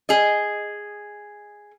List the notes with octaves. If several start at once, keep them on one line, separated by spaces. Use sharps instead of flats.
G#4 D#5